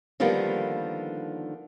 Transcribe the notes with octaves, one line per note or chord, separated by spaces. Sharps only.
D3 D#3 F3 G3 A#3 B3